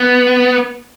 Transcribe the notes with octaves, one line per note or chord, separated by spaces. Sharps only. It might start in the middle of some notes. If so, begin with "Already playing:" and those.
Already playing: B3